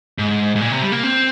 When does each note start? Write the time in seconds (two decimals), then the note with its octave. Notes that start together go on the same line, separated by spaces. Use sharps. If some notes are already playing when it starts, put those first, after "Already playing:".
0.19 G#2
0.56 G#2
0.61 A#2
0.71 C3
0.82 G3
0.92 A#3
1.04 C4